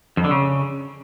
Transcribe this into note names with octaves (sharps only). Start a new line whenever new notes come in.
F2
D3
C#3